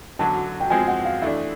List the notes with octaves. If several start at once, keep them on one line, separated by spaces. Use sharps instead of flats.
F#2 D3 F#3 A5
G5
F3 G#3 C4 G#5
F#5
F5
E3 A3 D4 E5